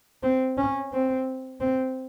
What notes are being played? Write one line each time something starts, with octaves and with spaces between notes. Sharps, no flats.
C4
C#4
C4
C4